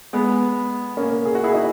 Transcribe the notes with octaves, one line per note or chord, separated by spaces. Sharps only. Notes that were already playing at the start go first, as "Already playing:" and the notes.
G#3 B3
A#3 C#4
G#4
F#4
E4 G#4
D#4 F#4